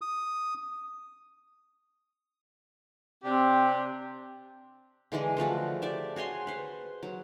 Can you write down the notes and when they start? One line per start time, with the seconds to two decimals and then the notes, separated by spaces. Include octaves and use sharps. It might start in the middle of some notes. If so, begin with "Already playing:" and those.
0.01 D#6
3.24 C3 C4 D4 G4
5.12 D3 E3 G#3 G#4
5.37 D3 F3 A3 F#4
5.82 G4 D5 E5
6.16 F#4 G#4 C#5 C6
6.47 B4 C5
7.03 F#3